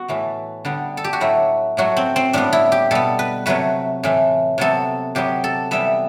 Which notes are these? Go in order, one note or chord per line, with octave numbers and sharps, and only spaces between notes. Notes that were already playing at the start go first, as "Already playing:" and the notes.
Already playing: B3 F#4
A2 E3 A3
D3 G3 B3
A4
G4
F#4
A2 F#3 A3 E4
A2 F#3 A3 F#4
C4
C4
A2 G3 B3 D4
E4
G4
B2 G3 B3 A4
B4
C3 F#3 A3 B4
A2 E3 A3
C3 F#3 B3 A4
C3 F#3 B3 G4
A4
C3 E3 G3 B3 E5